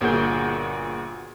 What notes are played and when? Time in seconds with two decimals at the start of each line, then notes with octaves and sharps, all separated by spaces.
0.01 G1 A#2 F#4 G#4 F#5 G6